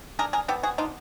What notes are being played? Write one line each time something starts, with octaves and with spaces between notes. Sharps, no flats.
D4 G#4 A#4
G#4 A#4
B3 G4 A4
F#4 G#4
D4 D#4 F4